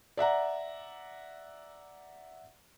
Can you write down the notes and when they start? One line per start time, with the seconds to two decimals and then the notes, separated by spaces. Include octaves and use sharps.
0.17 D5 E5 F#5 A#5